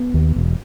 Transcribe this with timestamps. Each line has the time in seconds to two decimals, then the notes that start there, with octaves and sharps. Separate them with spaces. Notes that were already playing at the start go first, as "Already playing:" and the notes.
Already playing: B3
0.14 D#2
0.36 E1